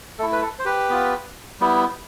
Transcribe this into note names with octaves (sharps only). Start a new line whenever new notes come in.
A3 E4 A4
B4
A4
C5
G4 B4
B3 F4
G3 B3 E4